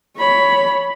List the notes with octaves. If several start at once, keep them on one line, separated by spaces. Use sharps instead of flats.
C#5 B5